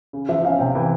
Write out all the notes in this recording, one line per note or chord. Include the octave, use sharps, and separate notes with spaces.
C#3
F3 E5
C#4 F5
C3 G5
E3